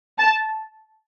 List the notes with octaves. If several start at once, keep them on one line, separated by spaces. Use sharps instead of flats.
A5